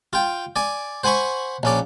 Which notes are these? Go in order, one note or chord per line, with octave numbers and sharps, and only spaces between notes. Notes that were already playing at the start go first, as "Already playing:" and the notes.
F4 G5
D5 G#5
C5 F#5 G#5 B5 C#6
A#1 C#4 D5